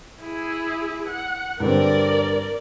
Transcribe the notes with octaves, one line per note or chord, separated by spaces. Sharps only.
E4 G#4
F#5
G2 D3 C4 A#4 D5